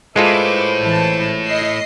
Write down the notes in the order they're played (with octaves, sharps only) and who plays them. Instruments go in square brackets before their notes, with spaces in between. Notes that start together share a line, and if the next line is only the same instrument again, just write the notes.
[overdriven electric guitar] A2 [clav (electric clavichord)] G#3 F4 A4 [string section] E4 B4 D6 [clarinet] C5
[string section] A1 E3 A5
D#5 C7